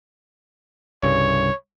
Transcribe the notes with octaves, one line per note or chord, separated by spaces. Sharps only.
C2 G2 C#3 C#5